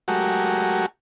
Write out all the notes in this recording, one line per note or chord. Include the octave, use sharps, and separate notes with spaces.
F#3 G#3 A3 F#4 G4 A#4